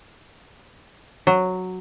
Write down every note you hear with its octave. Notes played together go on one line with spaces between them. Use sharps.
F#3